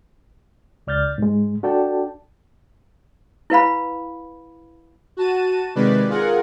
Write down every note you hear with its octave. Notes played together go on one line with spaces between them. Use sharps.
C#2 D5 F6 G6 A6
G#2 G#3
D4 F#4 A4 D5 G5 A5
E4 B4 F5 B5
F#4 A5 D#7
C3 D#3 G#3 B4 D5
F4 G#4 A#4 F#5